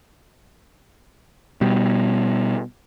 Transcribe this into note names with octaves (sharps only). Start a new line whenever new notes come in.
B2 G3